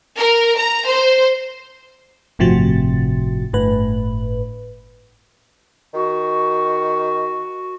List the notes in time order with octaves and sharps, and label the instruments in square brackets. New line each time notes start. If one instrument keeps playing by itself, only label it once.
[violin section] A#4
A#5
C5
[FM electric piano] G1 A2 C3 F3 F#4 A6
G1 A2 B4
[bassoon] D#3 [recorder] F#4